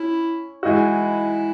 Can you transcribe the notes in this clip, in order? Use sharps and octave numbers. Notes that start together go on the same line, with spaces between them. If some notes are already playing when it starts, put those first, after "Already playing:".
Already playing: C#4 E4
E3 G#3 D#4 E4 F#4